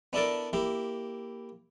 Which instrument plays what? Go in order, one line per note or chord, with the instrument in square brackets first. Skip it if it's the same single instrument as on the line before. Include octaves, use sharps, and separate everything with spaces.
[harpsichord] B3 D4 E4 A4 A#4 D5
A#3 E4 G4